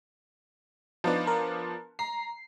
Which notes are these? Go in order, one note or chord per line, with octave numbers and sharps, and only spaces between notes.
F3 B3 D4 D#4
A#4
A#5 C7